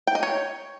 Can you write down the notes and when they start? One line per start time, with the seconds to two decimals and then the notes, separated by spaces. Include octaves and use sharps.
0.07 G5
0.15 D#5
0.23 C#5